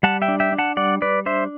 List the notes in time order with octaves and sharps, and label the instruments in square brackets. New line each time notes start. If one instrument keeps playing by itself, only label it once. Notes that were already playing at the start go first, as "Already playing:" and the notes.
[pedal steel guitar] G3 F#5 A5
E5 G5
D4
E5 G5
D4
F#5 A5
G3 D5 F#5
G3 B4 D5
D4 C5 E5